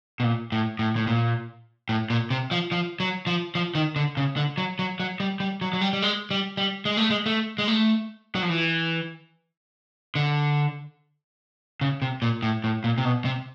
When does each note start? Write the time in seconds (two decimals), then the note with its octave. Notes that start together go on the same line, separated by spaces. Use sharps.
0.20 B2
0.23 A#2
0.52 A2
0.79 A2
0.96 A2
1.07 A#2
1.89 A2
2.10 A#2
2.30 C3
2.51 F3
2.72 F3
3.00 F#3
3.27 F3
3.55 F3
3.75 D#3
3.96 D3
4.17 C#3
4.37 D3
4.58 F#3
4.79 F#3
5.00 F#3
5.20 G3
5.40 G3
5.61 F#3
5.73 F#3
5.81 G3
5.93 G3
6.02 G#3
6.31 G3
6.57 G3
6.85 G#3
6.97 A3
7.10 G#3
7.26 A3
7.58 G#3
7.68 A3
8.35 F#3
8.42 F3
8.50 E3
10.15 D3
11.81 C#3
12.02 C3
12.22 A#2
12.43 A2
12.64 A2
12.84 A#2
12.98 C3
13.05 B2
13.25 C3